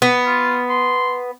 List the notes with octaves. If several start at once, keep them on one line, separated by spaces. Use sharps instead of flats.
B3
F4
C6